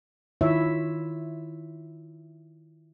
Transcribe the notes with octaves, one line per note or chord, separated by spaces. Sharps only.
D#3 E4 F4 C#5 E5